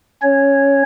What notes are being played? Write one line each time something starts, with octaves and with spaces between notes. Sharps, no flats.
C#4 C#5